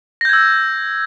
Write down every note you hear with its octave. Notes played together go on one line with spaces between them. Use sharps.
E6 G6 G#6 A#6